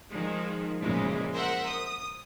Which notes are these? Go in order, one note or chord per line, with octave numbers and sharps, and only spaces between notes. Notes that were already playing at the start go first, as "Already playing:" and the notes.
D#3 F3 G#3
F#2 A#2 C#3 E3 F3 G#3
A#4 C5 E5 F#5
D#6